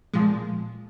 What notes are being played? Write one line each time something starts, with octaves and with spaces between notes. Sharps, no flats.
A#2 F3 G#3